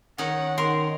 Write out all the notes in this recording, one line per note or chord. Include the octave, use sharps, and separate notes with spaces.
D#3 C#4 D#4 F#5
D#3 A#4 C6